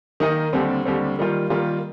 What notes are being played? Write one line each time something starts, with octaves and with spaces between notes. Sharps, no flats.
D#3 A#3 D#4 A#4 D#5
D#2 D3 G3 C4
D#2 D3 G3 C4
D#3 G3 A#3 F4
D#3 G3 A#3 F4